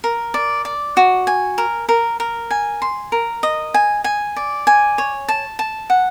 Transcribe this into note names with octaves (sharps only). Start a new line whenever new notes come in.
A#4
D5
D5
F#4
G#5
A#4
A#4
A#4
G#5
C6
A#4
D#5
G#5
G#5
D5
G#5
C#5
A5
A5
F#5